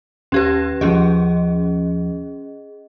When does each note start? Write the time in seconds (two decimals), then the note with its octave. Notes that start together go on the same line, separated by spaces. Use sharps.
0.32 D#2 C#4 G4 B4 G#6
0.81 D#2 F3 C#4 G#4 D#5